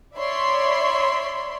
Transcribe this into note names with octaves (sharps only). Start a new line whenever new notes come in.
C#5 D5 E5 B5 C6